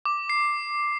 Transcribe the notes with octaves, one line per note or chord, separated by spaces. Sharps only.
D6
C7